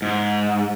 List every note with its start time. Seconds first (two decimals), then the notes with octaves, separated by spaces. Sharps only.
0.02 G#2